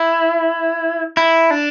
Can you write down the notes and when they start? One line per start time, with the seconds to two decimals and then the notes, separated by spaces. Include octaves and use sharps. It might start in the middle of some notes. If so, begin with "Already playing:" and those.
Already playing: E4
1.17 E4
1.51 D4